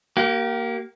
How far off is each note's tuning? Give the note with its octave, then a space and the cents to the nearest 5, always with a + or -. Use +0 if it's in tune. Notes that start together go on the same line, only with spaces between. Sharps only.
A#3 +0 G4 -35